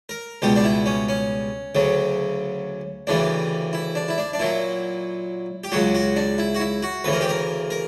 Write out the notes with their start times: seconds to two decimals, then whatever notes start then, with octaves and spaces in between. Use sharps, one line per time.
0.09 A#4
0.42 C#2 B2 G3 G4
0.56 D4
0.64 E4
0.86 C#4
1.08 C#4
1.75 D2 C#3 F#3
3.07 D2 C#3 E3 G3 D4
3.73 E4
3.95 D4
4.08 E4
4.18 D4
4.33 D4
4.39 A#2 F#3 E4
5.64 G4
5.72 C#2 C#3 F#3 F#4
5.95 F#4
6.16 D4
6.38 E4
6.55 F#4
6.60 E4
6.83 F#4
7.04 D2 C#3 E3 B4
7.13 A#4
7.21 G4
7.29 A#4
7.70 A#4